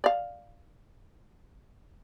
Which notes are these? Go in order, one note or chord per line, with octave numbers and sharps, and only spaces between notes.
D5 F5